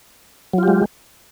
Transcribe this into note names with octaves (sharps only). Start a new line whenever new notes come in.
F#3 G#3 F4 G4